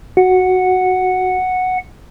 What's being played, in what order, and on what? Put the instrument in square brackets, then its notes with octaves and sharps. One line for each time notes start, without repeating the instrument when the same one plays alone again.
[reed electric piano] F#4 [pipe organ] F#5